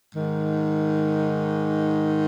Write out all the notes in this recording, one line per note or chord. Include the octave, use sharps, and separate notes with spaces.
G#2 D#3